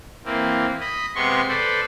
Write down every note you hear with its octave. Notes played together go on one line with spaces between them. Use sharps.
E3 A#3 C4
D#5 B5
C3 G#3 B3 C6 C#6
A4 B4 C5 D5